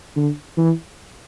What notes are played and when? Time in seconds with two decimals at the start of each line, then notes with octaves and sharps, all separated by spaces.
0.16 D3
0.57 E3